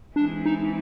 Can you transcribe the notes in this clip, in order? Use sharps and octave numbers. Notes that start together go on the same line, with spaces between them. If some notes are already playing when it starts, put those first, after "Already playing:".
E3 G#3 C4 D4 E4 G#4
D#4